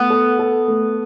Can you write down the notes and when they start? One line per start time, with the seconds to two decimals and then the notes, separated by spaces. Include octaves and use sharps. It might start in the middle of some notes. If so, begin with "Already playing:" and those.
Already playing: A3 B3
0.10 A4
0.39 A4
0.68 A3